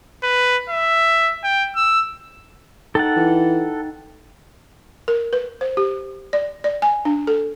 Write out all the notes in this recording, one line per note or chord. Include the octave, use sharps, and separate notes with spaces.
B4
E5
G5
E6
D#4 A4 F#5 G5 A6
E3
A#4
B4
C5
G4
D5
D5
G#5
D4
A4